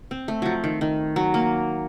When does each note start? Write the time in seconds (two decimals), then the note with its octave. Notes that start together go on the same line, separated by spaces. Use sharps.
0.11 C4
0.28 A3
0.42 F3 F#3
0.64 D#3
0.81 D#3
1.16 F#3
1.34 A#3